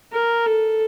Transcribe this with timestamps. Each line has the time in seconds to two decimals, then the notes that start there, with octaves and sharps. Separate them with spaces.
0.12 A#4
0.46 A4